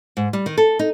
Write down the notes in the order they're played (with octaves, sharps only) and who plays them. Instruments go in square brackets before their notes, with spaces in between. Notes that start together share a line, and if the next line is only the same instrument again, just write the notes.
[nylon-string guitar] G#2
G3
D#3
A4
D#4